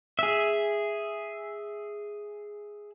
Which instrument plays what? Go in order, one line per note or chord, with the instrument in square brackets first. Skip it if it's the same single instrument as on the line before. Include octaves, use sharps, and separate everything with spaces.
[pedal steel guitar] G#4 E5